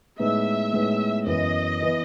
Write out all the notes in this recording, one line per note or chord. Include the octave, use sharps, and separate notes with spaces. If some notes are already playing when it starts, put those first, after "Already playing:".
A2 G#3 B3 D#4 E5
A2 G#3 B3 D#4
F#2 E3 B3 D#5
E3 B3